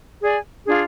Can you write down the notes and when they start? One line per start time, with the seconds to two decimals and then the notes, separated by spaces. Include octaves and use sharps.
0.22 G#4 D5 G#5
0.66 D4 F4 G#4